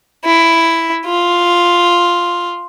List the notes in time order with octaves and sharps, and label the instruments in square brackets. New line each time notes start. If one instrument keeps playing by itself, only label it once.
[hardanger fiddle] E4
F4